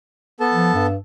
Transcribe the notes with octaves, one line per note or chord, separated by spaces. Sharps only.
B3 A4 A5
F3
G2